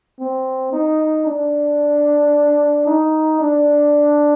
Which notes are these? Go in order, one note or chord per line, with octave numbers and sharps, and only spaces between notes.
C4
D#4
D4
D#4
D4